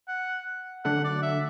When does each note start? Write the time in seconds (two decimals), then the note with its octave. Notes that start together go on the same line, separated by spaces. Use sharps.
0.08 F#5
0.84 D3 F#3 A3 D4 F#5
1.04 D5
1.22 E5